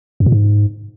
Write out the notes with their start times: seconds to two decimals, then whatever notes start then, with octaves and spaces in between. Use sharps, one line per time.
0.20 F#2
0.26 A#2
0.32 G#2